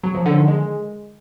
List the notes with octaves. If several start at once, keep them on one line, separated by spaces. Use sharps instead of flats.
F#3
F3
D3
D#3
G#3